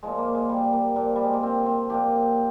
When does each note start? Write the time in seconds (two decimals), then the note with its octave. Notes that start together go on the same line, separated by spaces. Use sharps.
0.03 A#2 F3 G#3
0.18 A#3
0.34 G#3
0.49 G3
0.73 A#3
0.96 A#2 F3 A#3
1.16 G3
1.24 G#3
1.33 A#3
1.43 C4
1.66 C4
1.90 A#2 F3 G4